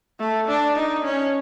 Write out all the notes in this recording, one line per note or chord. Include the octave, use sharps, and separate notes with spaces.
A3
D4
D#4
C#4